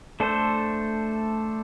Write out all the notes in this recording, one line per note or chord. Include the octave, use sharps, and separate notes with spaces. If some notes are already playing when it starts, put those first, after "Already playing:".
A3 D4 A4 C5